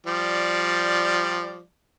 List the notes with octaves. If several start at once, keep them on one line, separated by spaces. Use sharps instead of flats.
F3 G3 D5